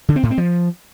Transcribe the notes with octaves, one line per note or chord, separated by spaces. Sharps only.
D3
C4
A2
C4
F3